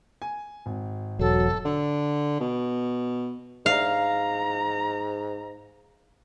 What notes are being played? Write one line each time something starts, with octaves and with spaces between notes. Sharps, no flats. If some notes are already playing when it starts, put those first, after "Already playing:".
G#5
G#1
E1 F#3 A4
D3
B2
G#2 F5 A#5